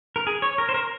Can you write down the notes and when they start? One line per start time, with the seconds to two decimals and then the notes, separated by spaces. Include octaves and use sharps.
0.16 A#4
0.27 G#4
0.42 C#5
0.58 A#4
0.69 C5
0.74 A#4